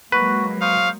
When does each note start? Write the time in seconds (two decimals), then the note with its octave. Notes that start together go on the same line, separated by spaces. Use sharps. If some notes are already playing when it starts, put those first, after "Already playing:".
0.12 F#3 G#3 A#3 F#4 B4
0.61 C5 F5 C#6 D#6